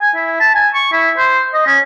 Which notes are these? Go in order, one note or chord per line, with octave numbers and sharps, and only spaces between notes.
G#5
E4
A5
G#5
C#6
E4
C5
D#5
C#4